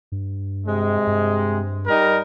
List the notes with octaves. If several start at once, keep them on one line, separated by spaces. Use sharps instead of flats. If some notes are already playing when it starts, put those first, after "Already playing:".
G2
C3 G#3
G2
G3 D#4 A#4